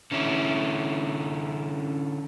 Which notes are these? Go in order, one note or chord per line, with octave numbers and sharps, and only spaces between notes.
D3 C#4 E4